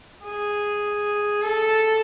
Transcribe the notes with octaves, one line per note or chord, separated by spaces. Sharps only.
G#4
A4